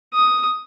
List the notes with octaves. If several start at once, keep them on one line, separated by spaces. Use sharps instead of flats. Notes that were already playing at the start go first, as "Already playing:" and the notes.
D#6